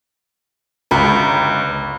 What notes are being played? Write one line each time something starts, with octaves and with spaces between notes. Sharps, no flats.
G1 C#2 A#5 B5